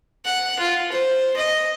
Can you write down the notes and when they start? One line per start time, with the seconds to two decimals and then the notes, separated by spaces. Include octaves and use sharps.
0.25 F#5
0.59 F4
0.92 C5
1.37 D#5